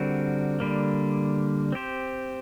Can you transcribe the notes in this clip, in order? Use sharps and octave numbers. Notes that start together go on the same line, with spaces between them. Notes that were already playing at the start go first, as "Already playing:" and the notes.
Already playing: D3 G3 C4 F#4 A#4
D3 G3 A#3
C4 G4 C5